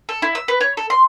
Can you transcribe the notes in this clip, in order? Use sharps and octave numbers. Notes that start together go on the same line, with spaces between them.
A4
E4
E6
B4
C#5
A4
C6